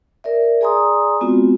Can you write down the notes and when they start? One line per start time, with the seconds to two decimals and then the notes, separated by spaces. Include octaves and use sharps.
0.24 A#4 D5 E5
0.61 G#4 D5 G#5 A#5 C6 D#6
1.21 G#3 B3 C4 F4 F#4